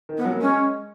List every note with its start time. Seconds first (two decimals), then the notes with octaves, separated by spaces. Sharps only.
0.09 D#3
0.17 B3
0.25 F#3
0.34 A#3
0.40 G#3 C#4